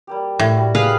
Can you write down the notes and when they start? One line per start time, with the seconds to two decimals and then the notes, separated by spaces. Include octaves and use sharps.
0.07 G3 A#3 G4
0.39 A2
0.55 G3 F#4
0.75 G#4 B4 F5